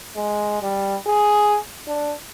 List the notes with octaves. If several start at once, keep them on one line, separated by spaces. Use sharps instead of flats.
G#3
G3
G#4
D4